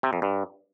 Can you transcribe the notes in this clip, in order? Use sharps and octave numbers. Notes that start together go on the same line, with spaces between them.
C3
F2
G2